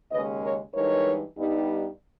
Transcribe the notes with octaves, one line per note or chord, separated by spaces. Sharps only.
D#2 C#3 G#3 C#4 B4 D#5
A#4 C#5
G2 E3 G#3 D#4 A#4 C#5
G2 G3 B3 D#4